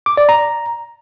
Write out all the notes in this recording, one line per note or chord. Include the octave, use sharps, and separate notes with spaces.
D6
D5
A#5